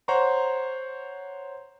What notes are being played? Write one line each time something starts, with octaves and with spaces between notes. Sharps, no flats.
C5 C#5 F#5 A#5 C6 C#6